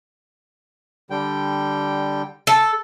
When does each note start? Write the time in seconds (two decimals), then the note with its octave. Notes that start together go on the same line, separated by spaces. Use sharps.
1.10 D3 G3 G5
2.47 A4